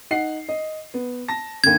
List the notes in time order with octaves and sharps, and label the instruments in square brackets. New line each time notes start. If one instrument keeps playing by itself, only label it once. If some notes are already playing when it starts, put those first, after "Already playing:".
[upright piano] D#4 F#5 C7
D#5
B3
A5 A#6
[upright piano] D#2 D3 [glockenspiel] G#6